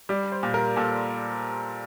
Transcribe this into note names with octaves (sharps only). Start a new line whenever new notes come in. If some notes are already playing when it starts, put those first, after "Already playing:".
G3 D5
C5
A#2
A#4
A#2 A4